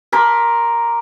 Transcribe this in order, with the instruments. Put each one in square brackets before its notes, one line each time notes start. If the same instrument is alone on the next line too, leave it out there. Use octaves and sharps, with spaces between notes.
[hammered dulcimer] A#4 B5 C6 D6